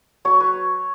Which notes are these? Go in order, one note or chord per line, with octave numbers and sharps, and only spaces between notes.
F#3 C#5 C#6
B4